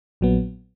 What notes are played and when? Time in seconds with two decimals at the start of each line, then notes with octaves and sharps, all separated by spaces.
0.21 A#1 A#2 F#3 B3